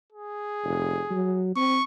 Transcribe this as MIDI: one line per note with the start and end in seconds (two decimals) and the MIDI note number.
0.13 1.44 68
0.64 1.00 29
1.11 1.54 54
1.56 1.79 60
1.56 1.83 85